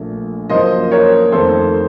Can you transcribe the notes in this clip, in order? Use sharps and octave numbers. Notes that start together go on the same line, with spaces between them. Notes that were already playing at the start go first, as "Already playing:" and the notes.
Already playing: A#1 A#2 A3
F#2 F3 A#3 C5 D#5
A#4 C#5
F2 D#3 A3 A4 C5